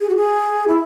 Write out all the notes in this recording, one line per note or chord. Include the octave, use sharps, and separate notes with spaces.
G#4
F#4
G#4
E4